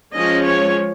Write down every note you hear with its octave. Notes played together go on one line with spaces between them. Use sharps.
F3 G#3 C#4 D#5
C#5